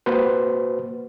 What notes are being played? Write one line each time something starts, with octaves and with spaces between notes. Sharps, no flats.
A#3 F#4 B4 C5